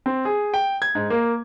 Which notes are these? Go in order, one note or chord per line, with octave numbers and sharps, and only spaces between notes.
C4
G#4
G5
G#6
G#2
A#3